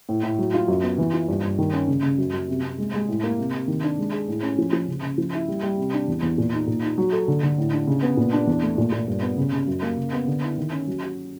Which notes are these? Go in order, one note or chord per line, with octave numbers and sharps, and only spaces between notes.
A2
A2
F#3
F4
F#2
B3
E3
F4
G2
G2
D#3
C#4
C#3
C#3
F#2
F#2
C3
C3
G#3
G#3
A2
A#3
C3
C3
D#3
D4
G#3
G#4
A2
C#4
F3
F3
C#3
C#3
F3
E4
G3
G3
C3
D4
E2
E2
A#2
D#4
A#2
D#4
F#3
A4
D3
D3
A2
D4
C#3
B3
A#2
D4
E2
A3
A#2
A#2
G2
B3
C#3
C#3
F#2
A#3
C#3
B3
D3
E4
D#3
C#4
F#3
F#4